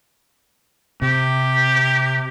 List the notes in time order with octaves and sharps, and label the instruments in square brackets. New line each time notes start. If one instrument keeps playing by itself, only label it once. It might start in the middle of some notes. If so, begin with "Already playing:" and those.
[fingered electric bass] C3 [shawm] G4